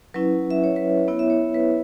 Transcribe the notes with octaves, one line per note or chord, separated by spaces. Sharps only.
F#3 C#4 E4 B4
E5
C#5
B4
B3 E4 C#5
E5
C#5
B4